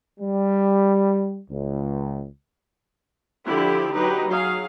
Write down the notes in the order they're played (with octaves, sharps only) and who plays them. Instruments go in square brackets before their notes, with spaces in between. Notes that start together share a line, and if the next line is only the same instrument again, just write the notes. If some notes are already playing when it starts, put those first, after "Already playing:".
[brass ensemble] G3
C#2
[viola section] D3 F3 E4 G4 B5
F#3 D#4 G4 B4
F#3 G#4 F5